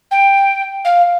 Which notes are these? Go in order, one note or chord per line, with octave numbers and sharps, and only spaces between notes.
G5
F5